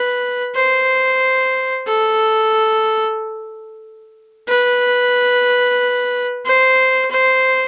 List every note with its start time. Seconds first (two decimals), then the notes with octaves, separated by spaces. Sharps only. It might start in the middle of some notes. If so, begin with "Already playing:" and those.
Already playing: B4
0.56 C5
1.87 A4
4.49 B4
6.45 C5
7.11 C5